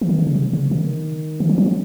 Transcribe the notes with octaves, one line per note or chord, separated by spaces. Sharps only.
E3
D#3
D3
C#3
C3
C#3
D#3
E3
F3
F#3
F3